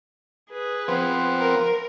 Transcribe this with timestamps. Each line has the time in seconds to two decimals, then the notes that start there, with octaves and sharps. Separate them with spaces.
0.50 G#4 B4
0.88 F3 B3 C4
1.41 A#4